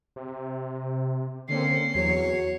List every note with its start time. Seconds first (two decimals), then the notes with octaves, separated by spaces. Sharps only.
0.16 C3
1.48 D3 A#3 C4 C#4 C7
1.95 E2 F#3 C#5